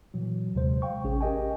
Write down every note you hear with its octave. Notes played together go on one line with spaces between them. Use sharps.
A#2 E3 F#3
D#2 C3 G#3 C5
F5 G5 C#6
A1 C#4 G#4
G4 A#4 D#5 G5 G#5